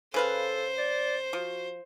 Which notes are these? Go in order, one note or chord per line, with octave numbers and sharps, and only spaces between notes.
C#3 A4 B4 C5 F5
D5
F3 F#4